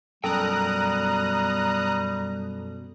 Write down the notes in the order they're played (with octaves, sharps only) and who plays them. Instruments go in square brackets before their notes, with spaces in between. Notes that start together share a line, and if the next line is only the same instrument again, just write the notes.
[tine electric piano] F#2 A4 [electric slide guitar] B2 G5 [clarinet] G3 [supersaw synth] A#5 D#6 F#6